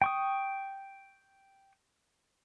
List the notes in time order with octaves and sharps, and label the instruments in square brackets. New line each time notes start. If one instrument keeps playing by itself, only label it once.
[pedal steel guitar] G5 C#6 D#6